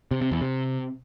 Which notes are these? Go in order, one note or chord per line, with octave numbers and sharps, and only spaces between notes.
C3
C3
E2
C3